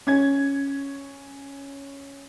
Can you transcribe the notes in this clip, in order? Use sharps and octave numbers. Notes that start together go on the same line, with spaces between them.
C#4 G#6